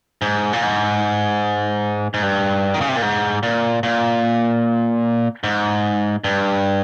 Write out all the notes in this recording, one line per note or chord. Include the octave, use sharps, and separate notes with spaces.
G#2
A#2
G#2
G#2
G2
D#3
C#3
C3
A#2
G#2
A#2
A#2
G#2
G2